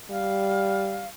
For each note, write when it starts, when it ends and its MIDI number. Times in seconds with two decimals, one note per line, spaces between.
0.10 1.06 55
0.10 1.07 77